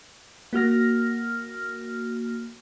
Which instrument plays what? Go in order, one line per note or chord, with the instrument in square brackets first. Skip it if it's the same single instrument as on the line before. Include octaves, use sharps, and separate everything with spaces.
[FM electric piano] A#3 F#4 F6 A#6